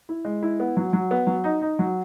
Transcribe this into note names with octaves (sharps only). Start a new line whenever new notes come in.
E4
G#3
E4
B3
F#3
F#3
B3
F#3
D#4
D#4
F#3